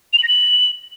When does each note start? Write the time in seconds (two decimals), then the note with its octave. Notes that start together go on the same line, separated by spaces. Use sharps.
0.13 F7
0.18 F#7
0.23 A#6
0.28 F#7